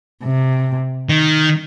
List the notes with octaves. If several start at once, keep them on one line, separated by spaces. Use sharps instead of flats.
C3
D#3